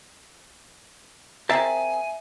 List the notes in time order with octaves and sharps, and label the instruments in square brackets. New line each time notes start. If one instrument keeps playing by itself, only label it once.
[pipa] C4 G#4 A#4 [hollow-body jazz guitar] E5 A5 [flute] G#5